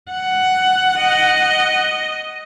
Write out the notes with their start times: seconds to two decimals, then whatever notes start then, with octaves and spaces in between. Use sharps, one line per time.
0.11 F#5
0.99 D#5